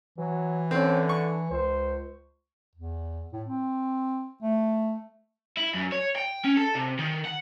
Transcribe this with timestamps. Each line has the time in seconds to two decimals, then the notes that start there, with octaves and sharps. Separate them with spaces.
0.18 E3 F#3
0.71 D3 C4 C#4
1.09 C#6
1.51 C#2 C5
2.75 E2
3.33 A2
3.48 C4
4.42 A3
5.57 E4
5.74 F#2
5.92 C#5
6.16 G5
6.45 C#4
6.57 A4
6.75 C3
6.99 D#3
7.25 F#5